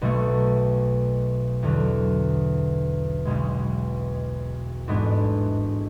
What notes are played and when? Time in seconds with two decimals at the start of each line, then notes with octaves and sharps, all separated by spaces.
0.01 B1 B2 A3
1.63 E2 D3 F#3
3.25 B1 B2 G#3
4.87 A1 G#2 G#3 B3 D4